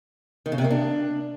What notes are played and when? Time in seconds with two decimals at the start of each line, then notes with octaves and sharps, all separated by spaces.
0.46 D#3
0.52 C#3
0.58 C3
0.64 A#3
0.71 D4